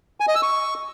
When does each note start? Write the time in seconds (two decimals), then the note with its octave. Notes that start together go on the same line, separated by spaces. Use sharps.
0.20 G#5
0.28 D#5
0.35 E6
0.43 C#6